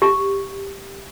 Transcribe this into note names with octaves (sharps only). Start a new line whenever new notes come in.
G4